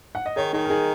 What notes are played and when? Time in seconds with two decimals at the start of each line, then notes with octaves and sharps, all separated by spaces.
0.15 F#5
0.26 D#5
0.36 D#3 G#4 C#5
0.53 D#3 D#4 G#4
0.65 A#4
0.70 D#4 G#4